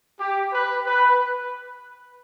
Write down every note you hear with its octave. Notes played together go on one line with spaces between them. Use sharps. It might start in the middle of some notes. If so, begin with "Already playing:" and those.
G4
B4
B4